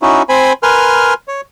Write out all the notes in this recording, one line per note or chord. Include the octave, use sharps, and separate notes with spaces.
C#4 D#4 E4 F#4
C4 C5 G#5 B5
A#4 B4 G#5 C6 F6
C#5